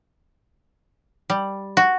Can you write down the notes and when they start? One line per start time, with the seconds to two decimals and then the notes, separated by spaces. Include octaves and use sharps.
1.30 G3
1.77 F#4